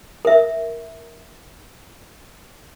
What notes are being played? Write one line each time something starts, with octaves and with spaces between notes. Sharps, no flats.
A#4 E5